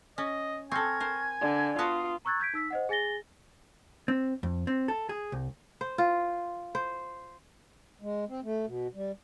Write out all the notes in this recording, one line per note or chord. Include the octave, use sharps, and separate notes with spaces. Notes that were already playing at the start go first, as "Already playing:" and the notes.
C#4 D#5
C4 A4 G#5 C#6 F6 A#6
A#4 C5
D3 D5
B3 F4 F#4 A5 D#6
A#5 C#6 E6 F#6 G#6 A6
G6 G#6 B6 D7
D#4 E6 B6
C5 D#5 F#5
G#4 G#5 A6 A#6 G7
C4
F2
C4
A4
G#4
C2
C5
F4
C5
G#3
C4
A3
B2
G3